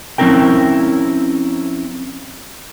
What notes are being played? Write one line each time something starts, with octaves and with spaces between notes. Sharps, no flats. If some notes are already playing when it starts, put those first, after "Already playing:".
F3 C4 C#4 E4 A#4 G5